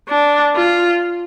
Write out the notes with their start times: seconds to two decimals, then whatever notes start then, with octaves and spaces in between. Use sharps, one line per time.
0.08 D4
0.56 F4